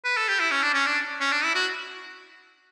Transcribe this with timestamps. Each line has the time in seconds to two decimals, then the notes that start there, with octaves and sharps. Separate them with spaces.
0.04 B4
0.17 A4
0.28 G4
0.40 E4
0.51 C#4
0.62 D4
0.74 C#4
0.86 D4
1.21 C#4
1.32 D4
1.44 E4
1.55 F#4